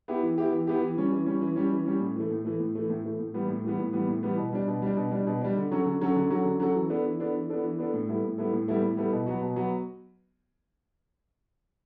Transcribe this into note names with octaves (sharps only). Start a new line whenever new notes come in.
B3 E4 G4
E3
B3 E4 G4
E3
B3 E4 G4
E3
G3 C#4
E3
G3 C#4
E3
G3 C#4
E3
G3 C#4
A2
E3 A3
A2
E3 A3
A2
E3 A3
A2
E3 A3
A2
E3 G3 B3
A2
E3 G3 B3
A2
E3 G3 B3
A2
E3 G3 B3
B2
G3 D4
B2
G3 D4
B2
G3 D4
B2
G3 D4
D3
F#3 C#4 F#4 A4
D3
F#3 C#4 F#4 A4
D3
F#3 C#4 F#4 A4
D3
F#3 C#4 F#4 A4
E3
B3 D4 A4
E3
B3 D4 A4
E3
B3 D4 A4
E3
B3 D4 A4
A2
G3 B3 E4 A4
A2
G3 B3 E4 A4
A2
G3 B3 E4 A4
A2
G3 B3 E4 A4
B2
F#3 B3 F#4
B2
F#3 B3 F#4